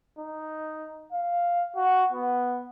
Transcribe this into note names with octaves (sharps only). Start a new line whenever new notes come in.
D#4
F5
F#4
B3